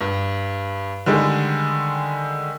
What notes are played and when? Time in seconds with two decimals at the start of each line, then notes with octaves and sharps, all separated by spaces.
0.01 G2
1.06 D3 D#3 G3 G#3